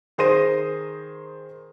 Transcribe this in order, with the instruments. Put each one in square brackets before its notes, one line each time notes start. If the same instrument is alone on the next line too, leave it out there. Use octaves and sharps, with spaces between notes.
[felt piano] D#3 G#4 C5 C6 A#6 D#7